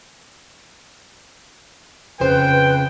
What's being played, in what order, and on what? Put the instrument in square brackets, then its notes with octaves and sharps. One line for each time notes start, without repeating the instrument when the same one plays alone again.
[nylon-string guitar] F2 C#3 C5 [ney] B4 [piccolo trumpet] G5